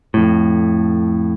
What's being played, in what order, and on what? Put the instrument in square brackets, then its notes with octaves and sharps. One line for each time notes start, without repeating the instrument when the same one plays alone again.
[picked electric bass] F2 A2